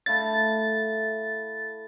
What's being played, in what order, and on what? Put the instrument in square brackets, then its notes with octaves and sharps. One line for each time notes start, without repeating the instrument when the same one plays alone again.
[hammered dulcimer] A3 E4 F5 [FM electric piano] A6